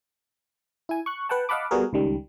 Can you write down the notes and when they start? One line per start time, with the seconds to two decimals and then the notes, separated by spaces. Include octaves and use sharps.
0.89 E4 G#5
1.06 C#6 F#6
1.29 B4 F#5 G5 A5
1.49 D#5 F5 F#5 A5 B5 D6
1.71 G3 B3 F#4 G#4 A#4
1.93 C#2 D#3 G3